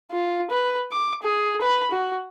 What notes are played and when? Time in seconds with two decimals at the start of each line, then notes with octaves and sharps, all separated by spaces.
0.12 F4
0.51 B4
0.92 D6
1.22 G#4
1.61 B4 B5
1.91 F#4